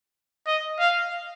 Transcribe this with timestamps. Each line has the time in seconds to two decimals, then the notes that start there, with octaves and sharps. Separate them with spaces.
0.47 D#5
0.79 F5